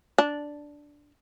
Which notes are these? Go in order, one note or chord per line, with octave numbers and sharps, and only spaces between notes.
D4